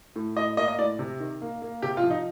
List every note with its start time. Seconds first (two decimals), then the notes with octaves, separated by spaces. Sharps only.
0.16 A2
0.37 A2 D#5
0.57 A#3 D#5
0.68 D#5
0.79 A2 D5
0.99 C3
1.20 D#3
1.41 A#3
1.62 A#3
1.82 C3 G4
1.97 F4
2.04 F3
2.10 D#4